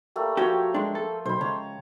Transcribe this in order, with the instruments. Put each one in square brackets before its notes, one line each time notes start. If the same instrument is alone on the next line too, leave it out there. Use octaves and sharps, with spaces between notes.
[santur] G3 A3 A#3
[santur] F3 C#5 G5 [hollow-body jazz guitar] F#4 G4
[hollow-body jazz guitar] G#3 D4 [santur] C6 C#6
[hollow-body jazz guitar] A4
[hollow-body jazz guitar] B1 [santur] C5 B5
[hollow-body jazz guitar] C#2 [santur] C#5 A5 A#5